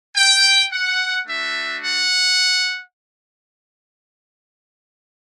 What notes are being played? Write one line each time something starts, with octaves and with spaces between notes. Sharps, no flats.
G5
F#5
A3 D4 F#4 E5
F#5